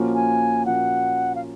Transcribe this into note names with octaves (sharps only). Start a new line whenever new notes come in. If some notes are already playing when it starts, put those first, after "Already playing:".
Already playing: A#2 F3 A#3 C#4 F#4
G#5
A#2 F3 A#3 C#4 F#4 F#5
F5